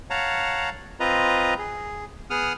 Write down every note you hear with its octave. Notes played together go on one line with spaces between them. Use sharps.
C#5 F5 F#5 A5 A#5
C4 F4 B4 D#5 A#5
G#4
B3 G#4 F#5 D#6 F6